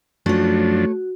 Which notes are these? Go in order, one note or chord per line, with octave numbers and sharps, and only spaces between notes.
F#2 F3 A3 D4 F#4 C#5